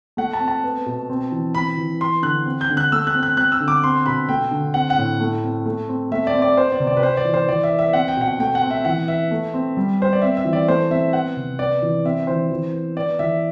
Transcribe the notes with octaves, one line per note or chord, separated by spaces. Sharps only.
A3 F#5
A5
C4
A5
B3
B2
C4
E3
C4 B5
E3
B3 C6
D3 F#6
C4
G6
D3
F#6
A3 E6
F#6
C4
F#6
C4 F#6
E6
D3
D6
C4 C6
B2 B5
A3 G5
D3
C4 F#5
F#5
A2
A3
C4
A3
C4
A3 E5
D5
C4
D5
B3 C5
D5
C3
D5
B4
B3 C5
D5
E3
C5
E3 D5
E5
B3
E5
C4 F#5
G5
B2 F#5
A3 G5
F#5
C4
E5
E3 F#5
B3 E5
A3
C4
G3
B3 C5
D5
C4 E5
E5
E3
D5
A3 C5
C4 E5
B3 F#5
C3
B3 D5
E3
C4 E5
E3 C5
E3
B3
B3 D5
E3 E5